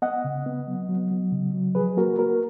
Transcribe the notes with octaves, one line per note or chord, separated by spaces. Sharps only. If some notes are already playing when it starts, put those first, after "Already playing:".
B3 D#5 F#5
C#3
B3
F#3
F#3
F#3
C#3
F#3
F3 G#4 B4
A#3 F#4 A#4
A#3 F#4 A#4